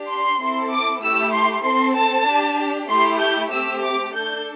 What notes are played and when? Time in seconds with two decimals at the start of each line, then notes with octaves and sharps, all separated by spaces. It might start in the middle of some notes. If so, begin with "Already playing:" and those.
Already playing: D4 G4
0.09 C6
0.40 C4 E4 A4
0.71 D6
1.02 A3 E4 G4 E6
1.33 C6
1.64 C4 A4 C6
1.96 A5
2.27 D4 G4
2.89 A3 E4 G4 C6
3.21 G6
3.52 A3 C4 G4 E6
3.83 D6
4.15 D4 A4 G6